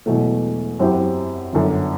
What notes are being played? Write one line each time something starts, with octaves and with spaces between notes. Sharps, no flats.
E1 E2 B2 F#3 A3
F#2 F#3 C4 E4 G4
G1 F#2 D3